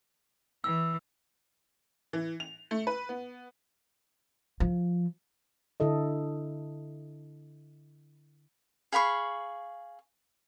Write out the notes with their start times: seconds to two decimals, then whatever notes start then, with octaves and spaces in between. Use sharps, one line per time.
0.64 E3 E6
2.13 E3
2.40 F7
2.71 A3
2.87 B4
3.09 B3
4.60 F3
5.80 D3 E4 A4 D#5
8.92 G#4 F5 B5 C#6